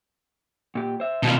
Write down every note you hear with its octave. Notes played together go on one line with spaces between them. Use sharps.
A#2 G4
C5 E5
B2 D#3 C4 F4